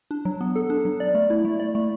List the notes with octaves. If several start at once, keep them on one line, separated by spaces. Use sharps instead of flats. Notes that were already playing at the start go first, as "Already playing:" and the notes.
D4
F#3
B3
A4
D4
F#3
D5
A3
E4
A3
D5
A3